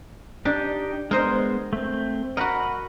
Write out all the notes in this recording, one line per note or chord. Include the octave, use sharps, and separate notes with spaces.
D4 D#4 G4
G#3 B3 A#4 C5 D#5
A3 C4
F#4 A#4 D#5 F#5 B5